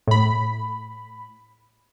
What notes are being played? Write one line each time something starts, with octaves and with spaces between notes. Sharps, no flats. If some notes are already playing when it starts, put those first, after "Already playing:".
A2 B5